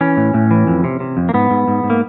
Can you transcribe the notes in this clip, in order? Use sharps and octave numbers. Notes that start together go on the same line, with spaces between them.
E3 C#4
A2
A2
E3
F2
C3
C3
F2
A#3
G#2 B3
G#2
G#2
G#2
A#3